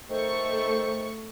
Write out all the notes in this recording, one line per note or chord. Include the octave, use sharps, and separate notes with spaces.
D#3 A3 C5 C#6